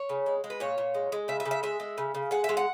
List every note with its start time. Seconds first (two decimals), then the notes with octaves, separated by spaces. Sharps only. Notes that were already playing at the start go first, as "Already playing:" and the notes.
Already playing: C#5
0.09 C#3
0.26 G#3
0.44 G#3
0.50 B4
0.60 A#2 C#5
0.78 A#2
0.94 G#3
1.12 G#3
1.28 C#3 E5
1.40 E5
1.45 C#3
1.51 E5
1.63 G#3 E5
1.80 G#3
1.98 C#3
2.15 C#3
2.31 G#3 F#5
2.44 G#3 E5
2.57 F#5